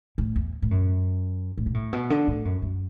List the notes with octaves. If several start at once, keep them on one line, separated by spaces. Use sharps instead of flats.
A2
E2
A2
F#2
A2
B2
A2
B2
D3
A2
F#2
F#2